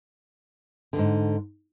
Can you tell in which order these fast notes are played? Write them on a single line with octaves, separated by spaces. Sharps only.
D3 F2 G#2